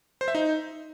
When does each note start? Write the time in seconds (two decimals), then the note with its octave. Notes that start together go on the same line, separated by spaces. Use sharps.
0.21 C5
0.28 E5
0.35 D#4